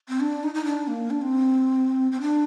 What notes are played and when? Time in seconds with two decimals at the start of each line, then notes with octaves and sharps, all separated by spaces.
0.09 C4
0.20 D4
0.43 D#4
0.55 D#4
0.65 D4
0.88 A#3
1.10 D4
1.22 C4
2.12 C4
2.21 D4